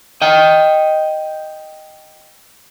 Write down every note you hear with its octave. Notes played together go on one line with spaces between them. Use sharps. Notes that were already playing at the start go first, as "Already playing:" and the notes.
D#5 G5